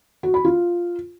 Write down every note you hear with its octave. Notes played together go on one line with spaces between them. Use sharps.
F#4
B5
F4